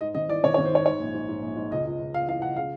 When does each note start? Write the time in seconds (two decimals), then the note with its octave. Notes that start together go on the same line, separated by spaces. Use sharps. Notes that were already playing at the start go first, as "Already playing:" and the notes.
0.01 G#2 D#5
0.15 G#1 D#5
0.29 E3 D5
0.44 G#1 C#5
0.54 C#5
0.58 G#1
0.65 C5
0.72 G#2 C#5
0.86 G#2 C#5
1.00 A#1
1.14 G#2
1.29 G#2
1.43 A#1
1.56 G#2
1.71 C#2 D#5
1.85 C#2
1.99 C#2
2.13 C#2 F5
2.27 E3 F5
2.42 C#2 F#5
2.56 C#3 F5